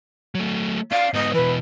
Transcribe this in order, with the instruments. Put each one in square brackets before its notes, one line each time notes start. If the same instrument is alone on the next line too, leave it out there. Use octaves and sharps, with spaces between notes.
[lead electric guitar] F#3 A3
[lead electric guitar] C#4 D5 [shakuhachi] F5
[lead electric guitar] G#2 B3 [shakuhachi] D#5
[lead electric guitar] B2 E3 [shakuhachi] B4